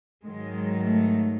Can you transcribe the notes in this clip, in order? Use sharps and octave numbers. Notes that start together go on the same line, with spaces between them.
G#2 D#3 F#3 G#3
A3